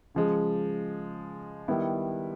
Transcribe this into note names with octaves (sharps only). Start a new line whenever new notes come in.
C#3 F3 G#3
D#3 G3 B3 E4